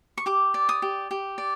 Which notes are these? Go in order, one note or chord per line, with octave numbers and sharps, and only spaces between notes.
C#6
G4 D6
D5
D#6
G4
G4
D5